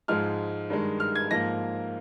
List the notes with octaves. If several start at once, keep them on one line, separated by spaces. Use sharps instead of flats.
G#2 F3 G#3 F6
G2 D#3 G#3
F6
G#6
G#2 F3 A#3 A#6